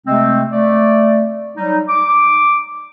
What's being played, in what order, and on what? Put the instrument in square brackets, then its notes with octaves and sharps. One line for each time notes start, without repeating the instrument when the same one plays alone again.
[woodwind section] C3 G#3 A3 C4
A3 D5
F#3 G3 D#4
D6